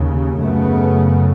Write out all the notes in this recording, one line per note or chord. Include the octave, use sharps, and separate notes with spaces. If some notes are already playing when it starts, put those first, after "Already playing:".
Already playing: D#2 C#3
F#2 C#3 A3 B3